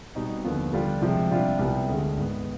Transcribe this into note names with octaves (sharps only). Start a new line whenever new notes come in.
B2 G3 C4 D#4
D#2 D3 F3 B3 F4
D3 G3 D4 F4
C3 F3 G#3
C3 G3 D4 F4
C2 C3 G3 B3
D2 D3 G#3 D4
G#2 D#3 B3